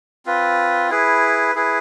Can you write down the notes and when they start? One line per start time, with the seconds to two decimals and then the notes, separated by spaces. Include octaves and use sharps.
0.26 C4 F4 B4
0.90 E4 G#4 B4
1.55 E4 G#4 B4